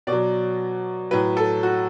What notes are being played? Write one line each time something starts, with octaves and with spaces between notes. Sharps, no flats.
B2 D5
F#3
A2 F#3 B4
A4
F#4